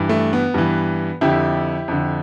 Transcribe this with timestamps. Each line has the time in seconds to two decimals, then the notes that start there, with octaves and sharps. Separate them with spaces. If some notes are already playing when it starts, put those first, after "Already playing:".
Already playing: G2 E3
0.09 A3
0.33 B3
0.54 G2 E3
1.21 F2 D3 E4 G4
1.88 F2 D3